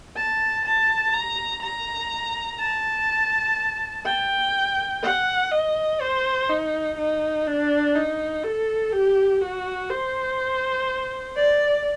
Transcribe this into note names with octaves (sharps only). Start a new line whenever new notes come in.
A5
A5
A#5
A#5
A5
G5
F#5
D#5
C5
D#4
D#4
D4
D#4
A4
G4
F#4
C5
D5